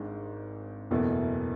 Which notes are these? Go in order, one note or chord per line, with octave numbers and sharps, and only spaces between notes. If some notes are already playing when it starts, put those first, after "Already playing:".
Already playing: G#1 G#2 G#3 D4
F#1 E2 B2 A3 E4